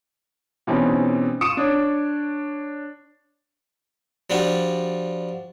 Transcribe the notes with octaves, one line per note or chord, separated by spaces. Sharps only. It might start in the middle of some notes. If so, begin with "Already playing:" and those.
B2 E3 G3 C4 C#4 D#4
F4 C#6 D#6 C#7 D7 E7
D4 C#5
F3 G3 D4 F#4